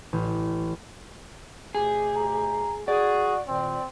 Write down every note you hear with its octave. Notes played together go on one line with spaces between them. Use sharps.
A1
D2 B2 G4 G#4
A#5
F#4 G#4 D5
A#2 D#3 C4